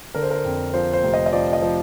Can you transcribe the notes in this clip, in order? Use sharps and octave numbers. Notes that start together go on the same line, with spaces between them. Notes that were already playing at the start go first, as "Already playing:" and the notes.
D3 A#4
C5
A#4
F2
F3 C5
C5
F1
D#5
D#5
F3 D5
D#5
F3